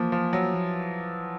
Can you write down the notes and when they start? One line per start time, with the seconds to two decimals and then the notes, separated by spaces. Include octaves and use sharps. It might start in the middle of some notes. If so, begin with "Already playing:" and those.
Already playing: E3 F3 A#3
0.12 F3
0.33 F#3
0.54 F3